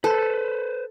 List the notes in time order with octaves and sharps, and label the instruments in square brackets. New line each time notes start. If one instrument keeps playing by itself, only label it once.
[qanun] A4 [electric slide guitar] B4 C5